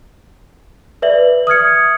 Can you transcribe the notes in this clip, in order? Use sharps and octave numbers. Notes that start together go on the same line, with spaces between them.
B4 D5 E5 F#7
D#6 F6 G#6 C#7